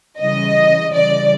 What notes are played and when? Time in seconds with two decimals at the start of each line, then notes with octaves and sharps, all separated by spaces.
0.19 C#3 E3 G3 D#5
0.94 C#3 E3 G3 D5